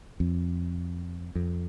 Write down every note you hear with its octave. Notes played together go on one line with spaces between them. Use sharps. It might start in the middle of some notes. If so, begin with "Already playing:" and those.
F2
F2